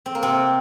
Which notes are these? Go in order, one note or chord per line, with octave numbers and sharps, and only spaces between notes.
C4
A#3
C3 C4